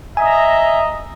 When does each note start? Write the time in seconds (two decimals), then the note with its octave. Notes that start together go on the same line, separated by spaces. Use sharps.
0.17 D#5 E5 G#5 A#5